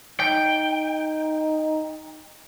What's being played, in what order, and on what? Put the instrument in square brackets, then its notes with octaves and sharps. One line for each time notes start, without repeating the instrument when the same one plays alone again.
[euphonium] D#4 [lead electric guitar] G5